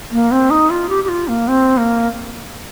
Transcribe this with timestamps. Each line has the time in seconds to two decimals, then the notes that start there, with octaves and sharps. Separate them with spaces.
0.11 A#3
0.32 C4
0.50 D#4
0.70 F4
0.89 G4
1.04 G4
1.09 F4
1.28 A#3
1.48 C4
1.77 A#3